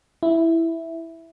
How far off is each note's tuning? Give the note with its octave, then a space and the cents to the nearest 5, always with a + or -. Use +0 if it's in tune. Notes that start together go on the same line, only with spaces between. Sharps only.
E4 +0